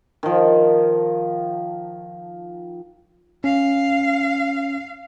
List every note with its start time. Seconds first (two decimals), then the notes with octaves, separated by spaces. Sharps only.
0.23 D#3 F3
3.44 C#4 F5